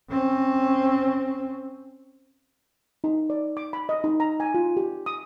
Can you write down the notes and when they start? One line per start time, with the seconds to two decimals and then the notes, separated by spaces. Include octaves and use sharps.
0.10 C4 C#4
3.04 D#4
3.30 D5
3.57 D6
3.73 B5
3.89 D#5
4.04 D#4
4.20 A#5
4.40 G#5
4.54 F4
4.77 G4
5.06 D#6